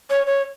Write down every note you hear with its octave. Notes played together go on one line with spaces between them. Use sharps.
C#5
C#5